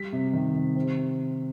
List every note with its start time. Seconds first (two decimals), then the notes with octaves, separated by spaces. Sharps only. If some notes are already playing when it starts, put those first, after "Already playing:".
Already playing: G3 B6
0.13 C3
0.33 D#3
0.55 C3
0.76 C4